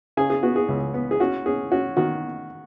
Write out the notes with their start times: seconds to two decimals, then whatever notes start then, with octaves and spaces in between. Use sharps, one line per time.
0.17 C#3 G#4 G#5
0.30 G#4
0.43 B3 F#4
0.56 G#4
0.68 C#2
0.94 B3
1.11 G#4
1.20 C#4 F#4
1.46 C#4 G#4
1.72 C#4 F#4
1.97 D#3 F#4